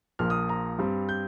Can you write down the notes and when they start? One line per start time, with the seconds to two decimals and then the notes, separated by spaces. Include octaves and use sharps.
0.19 A#1 A#2 F3 A#3 F6
0.30 D#6
0.49 A#5
0.79 G2 G3 C4
1.09 G6